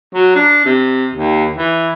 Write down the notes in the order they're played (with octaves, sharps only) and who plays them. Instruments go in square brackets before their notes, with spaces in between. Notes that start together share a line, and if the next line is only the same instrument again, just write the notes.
[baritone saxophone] F#3
D4
C3
D#2
E3